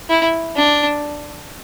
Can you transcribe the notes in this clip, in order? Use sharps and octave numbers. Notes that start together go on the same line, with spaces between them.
E4
D4